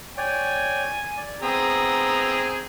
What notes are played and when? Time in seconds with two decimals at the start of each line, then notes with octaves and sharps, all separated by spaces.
0.17 C#5 D5 G5 G#5
1.17 D5
1.42 B3 C4 G#4 A#5 E6